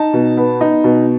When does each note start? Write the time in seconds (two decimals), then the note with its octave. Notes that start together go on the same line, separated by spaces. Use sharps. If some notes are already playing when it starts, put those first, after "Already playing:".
Already playing: D#4 A5
0.13 B2
0.37 B3
0.61 D#4
0.84 B2